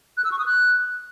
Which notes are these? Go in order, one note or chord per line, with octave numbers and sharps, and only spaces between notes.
F#6
E6
C#6
D#6
F#6